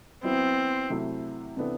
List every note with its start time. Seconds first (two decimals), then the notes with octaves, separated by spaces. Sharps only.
0.24 F#3 B3 C4 E4
0.90 C3 F#3 A3 E4
1.57 C3 E3 B3 D4 A4